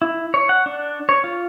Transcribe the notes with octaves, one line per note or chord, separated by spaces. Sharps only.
E4
C#5
F#5
D4
C#5
F4